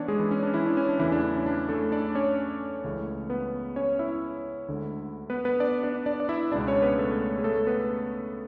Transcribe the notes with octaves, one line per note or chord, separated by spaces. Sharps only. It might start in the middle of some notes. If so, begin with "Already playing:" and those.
Already playing: E3 B3 C#4 D4 C#5 D5
G#3 G#4
E3 E4
C#4
D4
E3 E4
D4
C#4
D4
E2 C#3 E3 F#3 A3 E4
D4
D4
C#4
D4
A3 A4
D4 D5
C#4 C#5
C#2 C#3 E3 A3
B3 B4
C#4 C#5
E4 E5
D2 D3 G#3
B3 B4
B3 B4
D4 D5
D4 D5
D4 D5
D5
E4 E5
C#2 B2 G#3 D4 D5
C#4 C#5
B3 B4
A3 A4
G#4
A3 A4
B3 B4